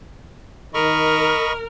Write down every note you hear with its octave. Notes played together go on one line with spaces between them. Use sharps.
D#3 A#4 D#5 B5 C#6